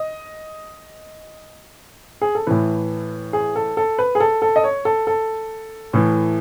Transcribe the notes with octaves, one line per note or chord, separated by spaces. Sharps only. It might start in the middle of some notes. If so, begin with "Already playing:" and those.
Already playing: D#5
G#4
A4
A2 E3 B4
G#4
A4
A4
B4
G#4
A4
A4
D#5
C#5
A4
A4
A2 E3